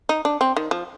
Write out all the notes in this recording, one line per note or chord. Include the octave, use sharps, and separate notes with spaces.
D#4
D4
C4
D#3
F3